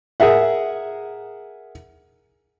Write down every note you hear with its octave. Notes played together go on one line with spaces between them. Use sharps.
G#4 A#4 E5 F#5